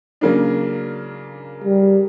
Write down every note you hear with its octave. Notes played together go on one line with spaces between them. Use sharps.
C#3 F#3 A#3 D4
G3